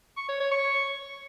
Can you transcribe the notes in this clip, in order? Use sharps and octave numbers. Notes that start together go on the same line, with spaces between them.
C#6
C#5
C#5
C#6